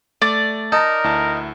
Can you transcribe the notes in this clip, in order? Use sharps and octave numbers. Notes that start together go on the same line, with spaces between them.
A3 D5
D#4 A#4 A5
D2 E4 A5